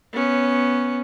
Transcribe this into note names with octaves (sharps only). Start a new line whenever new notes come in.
B3 C#4